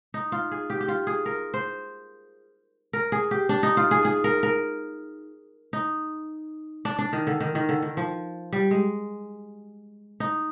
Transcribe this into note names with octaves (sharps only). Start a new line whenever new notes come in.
D#4
F4
G#4
G4
G4
F4
G#4
A#4
C5
A#4
G#4
G4
D4
D#4
F4
G#4
G#4
A#4
A#4
D#4
D4
D4
D#3
D3
D#3
D#3
D3
D#3
F3
G3
G#3
D#4